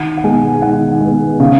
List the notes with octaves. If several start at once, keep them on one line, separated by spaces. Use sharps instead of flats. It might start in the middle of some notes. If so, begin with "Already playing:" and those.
Already playing: D#3 F#5
F#5
G#3 B3 G#5
D#3 F#5
G#3 B3
C#3